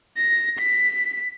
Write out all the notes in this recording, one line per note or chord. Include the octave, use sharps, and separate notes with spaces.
A#6
B6